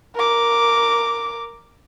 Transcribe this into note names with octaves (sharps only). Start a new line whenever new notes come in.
A#4 D6